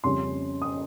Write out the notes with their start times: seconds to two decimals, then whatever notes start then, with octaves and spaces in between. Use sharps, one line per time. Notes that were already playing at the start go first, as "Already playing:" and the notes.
0.04 F2 C#3 G3 C#4 C6
0.62 D#6